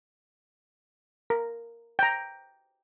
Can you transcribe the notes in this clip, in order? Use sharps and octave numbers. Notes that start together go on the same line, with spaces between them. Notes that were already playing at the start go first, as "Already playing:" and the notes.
A#4
G5 A#5